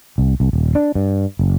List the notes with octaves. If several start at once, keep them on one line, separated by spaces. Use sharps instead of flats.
C2
C2
D#1
D4
G2
F#1